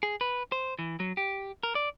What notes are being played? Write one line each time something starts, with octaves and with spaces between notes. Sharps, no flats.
G#4
B4
C5
E3
F#3
G4
A#4
D5